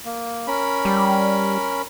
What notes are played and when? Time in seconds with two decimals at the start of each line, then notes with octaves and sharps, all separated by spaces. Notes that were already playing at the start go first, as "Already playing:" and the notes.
0.05 A#3
0.47 C#4 A#4 B5
0.85 G3